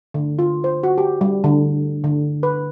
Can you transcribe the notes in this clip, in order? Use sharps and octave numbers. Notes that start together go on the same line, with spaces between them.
D3
F4
C5
F#4
G4
G3
D3
D3
B4